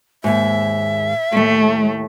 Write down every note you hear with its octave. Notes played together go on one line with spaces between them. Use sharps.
D#2 G#2 E5
D#2 A2 A3